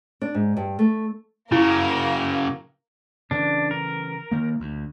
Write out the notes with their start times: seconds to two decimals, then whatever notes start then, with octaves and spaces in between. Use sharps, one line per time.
0.21 D4
0.35 G#2
0.57 G2
0.79 A3
1.52 C#3 F#3 A#3 E4 A#4
3.31 C#3 E3 D4
3.71 A#4
4.31 D#3 A#3
4.60 D2